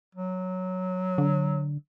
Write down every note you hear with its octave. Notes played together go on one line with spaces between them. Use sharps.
F#3
D3